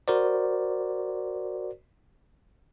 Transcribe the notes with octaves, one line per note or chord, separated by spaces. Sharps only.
F#4 A#4 C5 D5